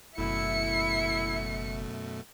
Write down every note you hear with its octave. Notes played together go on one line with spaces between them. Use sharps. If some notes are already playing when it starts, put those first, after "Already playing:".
F#1 F#2 B2 A3 E4 E5 C#7